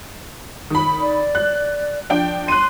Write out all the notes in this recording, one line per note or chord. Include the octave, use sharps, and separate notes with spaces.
D#3 B5
D5
F#6
F3 D4 G5
C6 F#6 D#7